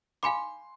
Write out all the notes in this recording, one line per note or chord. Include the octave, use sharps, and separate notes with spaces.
F5 G#5 B5 C6 D6